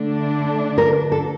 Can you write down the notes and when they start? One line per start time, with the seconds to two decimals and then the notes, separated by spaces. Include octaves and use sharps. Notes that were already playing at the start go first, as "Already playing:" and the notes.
Already playing: D3 A3 D4
0.78 A#4
1.12 A4